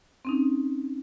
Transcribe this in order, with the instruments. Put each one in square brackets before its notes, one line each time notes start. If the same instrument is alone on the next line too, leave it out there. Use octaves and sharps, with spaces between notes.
[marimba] C4 C#4 D#4